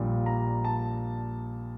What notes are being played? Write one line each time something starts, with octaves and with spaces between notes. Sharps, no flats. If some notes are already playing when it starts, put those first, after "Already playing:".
Already playing: A#1 A#2 G3 A#3
A#5
A5